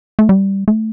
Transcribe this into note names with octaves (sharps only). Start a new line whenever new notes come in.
A3
G3
A3